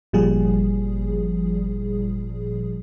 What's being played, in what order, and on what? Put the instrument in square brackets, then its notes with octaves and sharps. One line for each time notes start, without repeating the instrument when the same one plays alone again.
[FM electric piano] G1 A#2 F3 G3 G#4